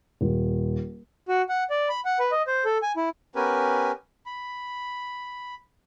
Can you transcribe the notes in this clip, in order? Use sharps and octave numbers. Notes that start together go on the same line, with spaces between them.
D#1
F#4
F#5
D5
B5
F#5
B4
D#5
C5
A4
G#5
E4
B3 C#4 G4 A#4 B4 G#5
B5